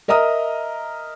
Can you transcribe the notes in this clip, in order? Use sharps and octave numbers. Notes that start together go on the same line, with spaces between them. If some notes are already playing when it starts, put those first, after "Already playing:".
A#4 D#5 E5 A#5 D#6 F6